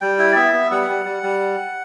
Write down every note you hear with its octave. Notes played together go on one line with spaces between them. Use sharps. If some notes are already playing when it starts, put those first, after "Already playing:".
G3 G5
E4
D5
B3 E5
B3
G3 F#5
G3
G3
G3